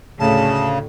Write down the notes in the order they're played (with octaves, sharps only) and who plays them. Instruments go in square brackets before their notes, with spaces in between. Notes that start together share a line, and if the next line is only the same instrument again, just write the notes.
[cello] D2 A2 [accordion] C#3 [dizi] A5